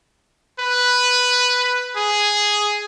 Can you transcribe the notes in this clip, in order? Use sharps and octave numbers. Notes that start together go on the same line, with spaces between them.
B4
G#4